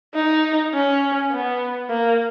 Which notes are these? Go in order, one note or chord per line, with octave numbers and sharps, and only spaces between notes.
D#4
C#4
B3
A#3